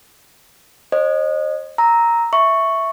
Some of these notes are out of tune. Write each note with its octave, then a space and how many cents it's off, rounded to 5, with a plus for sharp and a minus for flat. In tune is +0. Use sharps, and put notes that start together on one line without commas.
C5 +40 D#5 -25
A#5 +0 E6 -15
E5 +0 C#6 +0